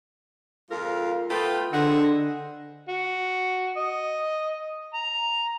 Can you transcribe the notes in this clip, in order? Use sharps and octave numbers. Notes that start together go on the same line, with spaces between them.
F2 G#2 F4 A#4
A3 B3 F4 G5 B5
D3 G#4 C5 D#5 F#5 E6
F#4
D#5
A#5